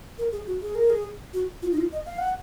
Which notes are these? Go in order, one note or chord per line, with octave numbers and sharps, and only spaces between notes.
A#4
G#4
F#4
G#4
A#4
G#4
F#4
F4
D#4
F4
D#5
F5
F#5